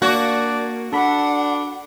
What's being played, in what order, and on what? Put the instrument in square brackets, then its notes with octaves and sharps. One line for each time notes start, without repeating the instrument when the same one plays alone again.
[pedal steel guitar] A#3 [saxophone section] D4 D5 [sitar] F#4
[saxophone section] D4 [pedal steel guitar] A4 B5 [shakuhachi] F#5